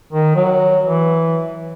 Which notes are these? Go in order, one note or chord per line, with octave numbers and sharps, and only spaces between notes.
D#3
F#3
E3